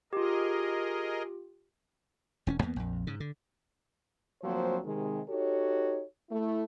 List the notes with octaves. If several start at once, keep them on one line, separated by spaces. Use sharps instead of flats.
F4 G4 G#4 A#4 D#5
E1 C4 C#4
E2 A#3 B3
A#1 F2
G#2 C#3
D3
D2 F3 F#3 A#3 C4 C5
C3 D#3 G#3
D#4 F#4 G4 A4 C#5
A3 E4